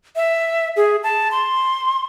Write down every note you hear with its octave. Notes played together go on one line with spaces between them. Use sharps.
E5
G#4
A5
C6